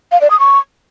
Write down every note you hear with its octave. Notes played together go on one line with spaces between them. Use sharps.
F5
D5
D#6
C#6